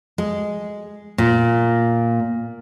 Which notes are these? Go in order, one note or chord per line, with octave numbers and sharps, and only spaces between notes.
G#3
A#2